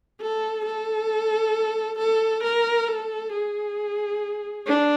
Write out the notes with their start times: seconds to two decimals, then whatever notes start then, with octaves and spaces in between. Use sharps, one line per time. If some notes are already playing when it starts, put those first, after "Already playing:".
0.21 A4
0.65 A4
1.99 A4
2.43 A#4
2.88 A4
3.33 G#4
4.67 D4